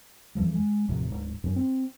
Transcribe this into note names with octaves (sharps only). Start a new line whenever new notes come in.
F2 E3 F3 G3
G#3
D#1 F2 A2 C3
D1 G#2
F#2 C#4
C4